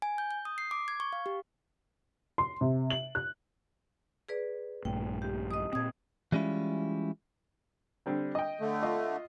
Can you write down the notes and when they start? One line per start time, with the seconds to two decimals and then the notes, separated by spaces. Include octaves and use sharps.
0.02 G#5
0.18 G6
0.31 G6
0.45 D#6
0.58 C7
0.71 D6
0.88 G#6
1.00 C#6
1.13 F5
1.26 G4
2.38 C6
2.61 C3
2.90 F#7
3.15 F#6
4.29 G#4 B4 D5
4.85 A#1 G2 A3 G5
5.22 G4
5.51 D#5 D#6
5.73 A#2 C4 D#6 G#6
6.32 E3 G3 G#3 C#4 E4 F4
8.06 D3 G3 C4
8.35 D#5 G5
8.60 D3 A3
8.83 F4 D#5